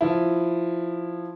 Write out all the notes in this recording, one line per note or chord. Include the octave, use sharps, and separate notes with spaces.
F3 E4